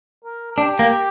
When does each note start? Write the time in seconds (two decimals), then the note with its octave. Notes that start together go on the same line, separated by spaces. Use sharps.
0.24 A#4
0.51 A#4
0.57 D4 G4
0.79 A#3